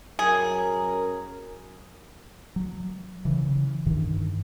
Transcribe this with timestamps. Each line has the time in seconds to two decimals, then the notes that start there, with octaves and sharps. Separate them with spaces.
0.19 F#2 F#3 G#4 A#4
2.56 F#3
3.25 C#3 E3
3.86 G2 D#3 E3